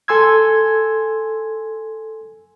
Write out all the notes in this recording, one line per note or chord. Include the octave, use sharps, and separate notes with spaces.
A4 G#5 C6 E6 G#6